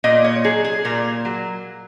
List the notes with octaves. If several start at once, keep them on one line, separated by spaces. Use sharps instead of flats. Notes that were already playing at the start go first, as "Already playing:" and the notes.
A#2 D#5
C#5
F#3 G#4
G#4
A#2 A#4
F#3